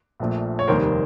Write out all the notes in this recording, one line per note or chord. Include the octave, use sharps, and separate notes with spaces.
A#1 A#2 F3 A3
C#5
F1 D#2 D#3 G3 A#3 A#4 C5